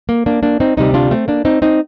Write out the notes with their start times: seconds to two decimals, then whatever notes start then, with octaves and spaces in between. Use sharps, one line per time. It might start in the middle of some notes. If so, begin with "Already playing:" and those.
0.09 A#3
0.26 A#3 D4
0.43 A#3 D4
0.60 C4 D#4
0.77 D2 C3 G3 C4 D#4
0.94 D4 F4
1.11 A3 C4
1.28 A#3 D4
1.45 C4 D#4
1.62 C4 D#4